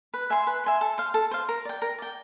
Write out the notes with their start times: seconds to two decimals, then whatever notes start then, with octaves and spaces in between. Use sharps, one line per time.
0.14 B4
0.30 E5 G#5 C6
0.47 B4
0.64 E5 G#5 C6
0.81 A4
0.98 C5 F5
1.14 A4
1.31 C5 F5
1.49 A#4
1.65 D5 G5
1.82 A#4
1.99 D5 G5